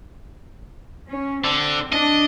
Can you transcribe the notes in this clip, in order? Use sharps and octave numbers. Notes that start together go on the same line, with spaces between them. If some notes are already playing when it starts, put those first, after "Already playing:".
C#4
D3 C4
D4 D#5